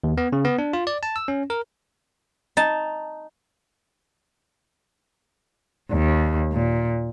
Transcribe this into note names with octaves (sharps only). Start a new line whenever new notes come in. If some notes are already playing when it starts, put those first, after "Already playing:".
D#2
B3
C#3
B3
D4
F4
D5
A5
E6
C#4
A#4
D#4 A5
D#2
A#2